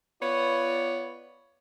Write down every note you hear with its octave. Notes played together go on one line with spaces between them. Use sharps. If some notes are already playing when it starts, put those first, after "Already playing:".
B3 F4 C#5 D5